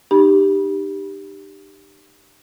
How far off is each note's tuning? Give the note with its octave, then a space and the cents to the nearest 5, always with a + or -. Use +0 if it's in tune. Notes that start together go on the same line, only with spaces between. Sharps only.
D#4 -40 G4 +0 B5 -25